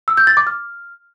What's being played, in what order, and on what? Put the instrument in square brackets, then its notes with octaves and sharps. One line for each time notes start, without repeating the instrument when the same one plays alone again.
[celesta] E6
G6
A6
D6
F6